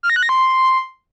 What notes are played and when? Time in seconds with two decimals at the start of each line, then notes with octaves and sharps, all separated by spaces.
0.03 F6
0.10 A#6
0.16 F#6
0.23 A#6
0.29 C6